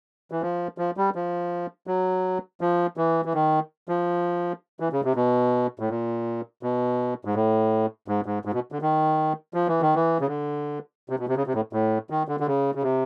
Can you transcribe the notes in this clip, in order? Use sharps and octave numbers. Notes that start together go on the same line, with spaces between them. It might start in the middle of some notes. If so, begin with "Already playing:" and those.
E3
F3
F3
G3
F3
F#3
F3
E3
E3
D#3
F3
E3
C#3
C3
B2
A2
A#2
B2
G#2
A2
G#2
G#2
G#2
B2
D3
D#3
F3
E3
D#3
E3
C#3
D3
C3
B2
C3
C#3
C3
A2
A2
D#3
D3
D3
C#3
C#3
C3